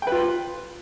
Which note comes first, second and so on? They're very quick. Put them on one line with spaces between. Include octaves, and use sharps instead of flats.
G5 B4 F4